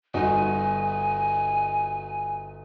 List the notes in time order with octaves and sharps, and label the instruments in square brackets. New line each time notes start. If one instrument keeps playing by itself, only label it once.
[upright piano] G1 D#4 F#4 [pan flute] G#5